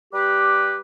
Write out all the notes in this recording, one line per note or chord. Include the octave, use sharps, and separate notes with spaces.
G3 G4 B4 D6